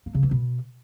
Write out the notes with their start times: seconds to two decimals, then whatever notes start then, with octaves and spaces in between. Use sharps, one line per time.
0.06 A#3
0.15 C#3
0.23 E3
0.31 B2